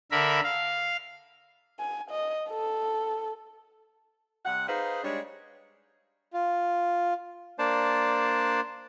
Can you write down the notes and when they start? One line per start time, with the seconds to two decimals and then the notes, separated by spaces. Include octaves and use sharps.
0.11 D3 A#4 E5 B5
0.43 F5
1.79 G#5
2.11 D#5
2.50 A4
4.46 C3 G3 F#5
4.68 D#4 G#4 B4 C5 F5
5.04 G3 G#3 D4 C#5
6.33 F4
7.59 A#3 D4 C5 D5 A5